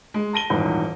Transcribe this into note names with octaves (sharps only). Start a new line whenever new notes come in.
G#3
A5 A#6 D#7 G7
D#1 E2 G#2